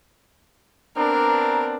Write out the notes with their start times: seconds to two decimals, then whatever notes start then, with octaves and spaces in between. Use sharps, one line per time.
0.97 B3 C4 D4 A#4 A#5